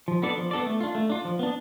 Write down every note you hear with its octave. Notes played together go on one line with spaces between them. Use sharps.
F3
B3 D4 A4 D5
F3
B3 D4 A4 D5
A3
D4 F4
A3
D4 F4
F3
B3 D4